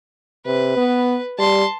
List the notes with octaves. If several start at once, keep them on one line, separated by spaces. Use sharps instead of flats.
C3 B4
B3
G3 A5 C6